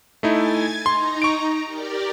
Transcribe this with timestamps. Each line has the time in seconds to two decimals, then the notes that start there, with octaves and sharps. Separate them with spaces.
0.23 A3 D#4 E4 G#5 G#6 A6
0.86 D#4 A#5 C6
1.22 C#6 D7
1.65 G4 A#4 D5